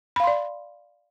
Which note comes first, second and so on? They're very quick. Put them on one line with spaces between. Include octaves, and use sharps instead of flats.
B5 F5 C6 D5